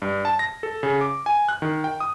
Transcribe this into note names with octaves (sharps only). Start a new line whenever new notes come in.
G2
A5
A#6
A4
C#3
D6
G#5
F#6
D#3
G5
D#6